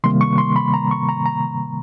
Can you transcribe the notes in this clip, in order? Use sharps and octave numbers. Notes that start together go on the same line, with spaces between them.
C3 D#3 G3 A#3 C6
C#6
C6
B5
A#5
C#6
A#5
A#5